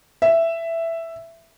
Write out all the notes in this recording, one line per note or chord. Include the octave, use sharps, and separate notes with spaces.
E5